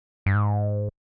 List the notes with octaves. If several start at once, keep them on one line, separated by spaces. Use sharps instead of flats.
G2
G#2